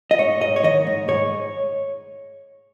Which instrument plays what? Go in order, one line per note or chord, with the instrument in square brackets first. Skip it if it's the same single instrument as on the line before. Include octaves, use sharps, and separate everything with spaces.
[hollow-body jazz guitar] D#5
G#2 C#5
G#2 D#5
C#5
D#3 D#5
G#2
G#2 C#5